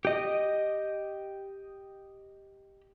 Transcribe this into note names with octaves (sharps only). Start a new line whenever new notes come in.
G4 D#5